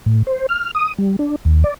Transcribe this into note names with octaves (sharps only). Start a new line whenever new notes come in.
A2
C5
F6
D#6
G3
D4
D#2
D5